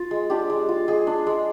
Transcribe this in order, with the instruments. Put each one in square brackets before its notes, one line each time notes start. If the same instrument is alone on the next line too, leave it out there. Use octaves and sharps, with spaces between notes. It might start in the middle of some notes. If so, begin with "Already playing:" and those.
Already playing: [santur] F4
G#3
D4 G4
G#3
F4
G#3 G#4
D4
G#3